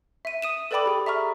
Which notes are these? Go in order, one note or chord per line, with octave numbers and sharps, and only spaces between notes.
E5 D#7
D#6 D#7 E7
A4 B4 D5 G5 B5 D6
G4 G#4
E5 A#5 C#6 F6